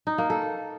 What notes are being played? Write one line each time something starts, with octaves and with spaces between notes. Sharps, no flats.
D#4
A#3
A4